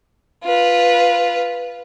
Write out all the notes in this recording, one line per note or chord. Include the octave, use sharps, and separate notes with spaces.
F4 B4